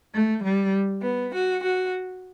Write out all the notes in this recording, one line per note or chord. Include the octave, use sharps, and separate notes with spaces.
A3
G3
B3
F#4
F#4